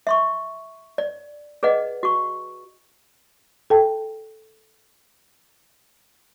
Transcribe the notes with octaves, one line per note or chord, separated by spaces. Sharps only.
E5 C6 C#6
D5
G#4 B4 D5 D#5 F#5
F#4 C#6
A4 G5 A5